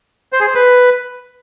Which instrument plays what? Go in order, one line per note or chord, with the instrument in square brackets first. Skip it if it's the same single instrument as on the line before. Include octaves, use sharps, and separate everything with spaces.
[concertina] C5
G#4
C5
B4